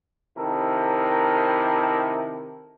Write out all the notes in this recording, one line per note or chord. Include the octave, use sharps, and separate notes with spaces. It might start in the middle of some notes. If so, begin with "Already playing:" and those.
C3 D#3 E4 A4 A#4